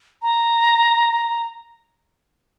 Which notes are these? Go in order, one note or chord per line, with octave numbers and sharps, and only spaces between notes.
A#5